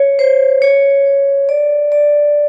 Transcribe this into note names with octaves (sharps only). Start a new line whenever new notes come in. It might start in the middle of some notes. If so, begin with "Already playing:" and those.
Already playing: C#5
C5
C#5
D5
D5